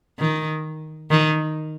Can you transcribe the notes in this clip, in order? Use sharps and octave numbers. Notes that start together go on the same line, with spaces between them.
D#3
D#3